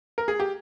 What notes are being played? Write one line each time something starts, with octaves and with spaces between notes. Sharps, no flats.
A#4
G#4
G4